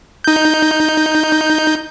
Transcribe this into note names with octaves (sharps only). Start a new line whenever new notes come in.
D#4 G6